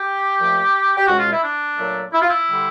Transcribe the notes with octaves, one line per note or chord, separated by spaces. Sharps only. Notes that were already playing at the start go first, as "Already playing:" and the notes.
Already playing: G4
A#2 F3 A3
G4
C#2 B2 G#3 F#4
F4
E4
D4
A#2 F#3 A3
E4
F4
E4
D3 G3